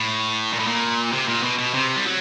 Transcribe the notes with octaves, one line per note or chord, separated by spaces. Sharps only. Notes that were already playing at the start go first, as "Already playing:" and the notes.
Already playing: A2
A#2
A2
A#2
C3
A#2
B2
B2
C3
G3
F#3